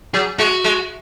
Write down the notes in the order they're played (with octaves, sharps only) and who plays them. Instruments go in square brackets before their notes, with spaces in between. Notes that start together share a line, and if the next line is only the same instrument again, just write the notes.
[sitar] F#3 [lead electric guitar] G#4
[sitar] G#3 [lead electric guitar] F#4
[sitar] G#3